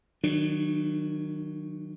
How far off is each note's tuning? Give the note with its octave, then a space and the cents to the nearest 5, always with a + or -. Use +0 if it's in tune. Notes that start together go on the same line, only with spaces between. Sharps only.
D#3 +0 F#3 +0 D4 +35